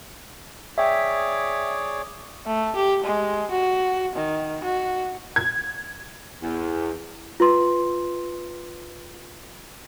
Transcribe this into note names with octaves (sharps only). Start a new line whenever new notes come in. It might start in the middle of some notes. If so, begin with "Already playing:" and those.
G#4 C#5 D5 E5 G5
A3
G4
G#3
F#4
D#3
F#4
G#6
E2
F4 B4 C6